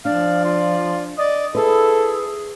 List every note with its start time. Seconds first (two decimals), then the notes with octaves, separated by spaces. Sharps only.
0.05 F3 D4 D5 F5
0.44 F4
1.18 D5 D#5
1.55 E4 G#4 A4 B4